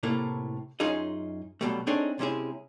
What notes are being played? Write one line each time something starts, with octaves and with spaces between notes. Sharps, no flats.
A2 C3 A3 A#3 E4
F#2 C#4 D#4 F4 G#4 D#5
B1 G2 B2 G3 A3
C4 D4 D#4 G#4 A4 C#5
C3 G#3 C#4 E4 G#4